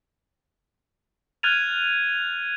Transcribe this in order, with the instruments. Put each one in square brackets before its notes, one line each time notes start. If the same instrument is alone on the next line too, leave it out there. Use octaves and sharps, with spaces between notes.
[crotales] F6 F#6 G#6 A6 D#7 F7